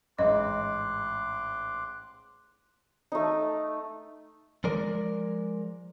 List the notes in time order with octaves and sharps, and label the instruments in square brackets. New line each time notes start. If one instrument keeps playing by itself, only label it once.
[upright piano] A1 G#2 [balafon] D#5 [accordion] C6 D6 F#6
[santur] A3 D#4
[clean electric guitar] F3 G#3 A#4 D5